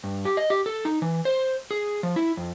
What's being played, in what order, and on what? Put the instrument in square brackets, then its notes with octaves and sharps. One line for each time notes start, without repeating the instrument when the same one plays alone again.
[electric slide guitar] G2
G4
D#5
G4
A4
D#4
E3
C5
G#4
F3
E4
F2